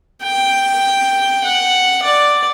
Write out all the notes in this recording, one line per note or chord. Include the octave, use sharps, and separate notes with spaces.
G5
F#5
D5